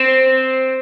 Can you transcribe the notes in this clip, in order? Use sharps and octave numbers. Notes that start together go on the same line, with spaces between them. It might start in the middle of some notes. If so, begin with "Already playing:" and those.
Already playing: C4